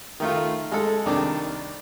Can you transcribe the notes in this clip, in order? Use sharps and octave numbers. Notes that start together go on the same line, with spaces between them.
D#3 A3 F4
G#3 A4
C2 D#3 D4 D5